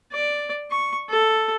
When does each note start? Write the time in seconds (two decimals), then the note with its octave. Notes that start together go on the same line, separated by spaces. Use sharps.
0.12 D5
0.71 C#6
1.10 A4